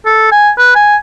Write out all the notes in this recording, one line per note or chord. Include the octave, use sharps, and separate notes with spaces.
A4
G#5
B4
G#5